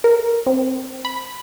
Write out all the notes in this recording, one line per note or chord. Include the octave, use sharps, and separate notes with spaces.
A#4
C4
B5